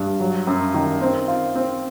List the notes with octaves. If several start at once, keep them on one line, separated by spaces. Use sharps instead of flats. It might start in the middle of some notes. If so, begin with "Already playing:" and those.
Already playing: G2
F#3
F#2
D#3
C4
F4
C4